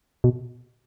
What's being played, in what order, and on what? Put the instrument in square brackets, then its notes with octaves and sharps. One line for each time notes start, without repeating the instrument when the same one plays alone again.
[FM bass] B2